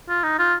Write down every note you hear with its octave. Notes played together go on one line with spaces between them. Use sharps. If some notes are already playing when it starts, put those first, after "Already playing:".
F4
D#4
F4